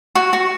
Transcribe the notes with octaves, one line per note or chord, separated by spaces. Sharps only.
F#4
F#4